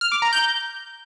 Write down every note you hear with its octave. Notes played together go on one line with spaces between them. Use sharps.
F6
D6
A#5
G6